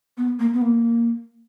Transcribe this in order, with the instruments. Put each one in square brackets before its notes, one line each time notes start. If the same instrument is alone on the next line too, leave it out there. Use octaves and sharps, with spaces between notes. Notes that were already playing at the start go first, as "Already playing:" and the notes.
[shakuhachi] B3
A#3
B3
A#3